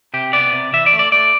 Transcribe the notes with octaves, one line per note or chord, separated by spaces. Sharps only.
C3 G4
B3 D5
C3
E3 E5
D5
A3
D5
A3 D5